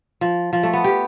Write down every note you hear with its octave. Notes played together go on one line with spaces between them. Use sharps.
F3
F3
A3
B3
G4